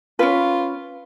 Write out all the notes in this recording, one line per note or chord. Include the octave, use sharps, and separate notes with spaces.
C#4 F4 B4